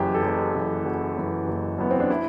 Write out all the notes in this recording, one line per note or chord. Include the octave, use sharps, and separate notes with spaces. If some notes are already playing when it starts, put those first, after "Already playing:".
Already playing: F#1 F#2 E3 G4 B4
A4
F#1 G4
F#2 E3
F#1 F#4
F#2 E3
F#1
F#2 E3 B3
C4
D4
E4